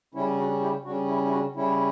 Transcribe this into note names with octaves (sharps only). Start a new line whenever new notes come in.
C#3 G3 C#4 E4
D4 F#4
E4 G4
C#3 G3 C#4 D4 F#4
E4
E4
D4 F#4
C#3 G3 C#4 E4